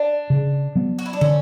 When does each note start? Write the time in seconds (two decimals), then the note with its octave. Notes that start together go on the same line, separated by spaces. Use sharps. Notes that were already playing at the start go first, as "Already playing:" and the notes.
Already playing: D4
0.30 C#3
0.75 F#3 B3
0.99 F#4
1.06 E4
1.13 D4
1.21 D3 C#4